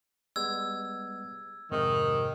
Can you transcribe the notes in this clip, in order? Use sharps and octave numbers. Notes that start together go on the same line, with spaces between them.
G3 G#3 B3 E6 G#6
F2 G#2 C3 D#3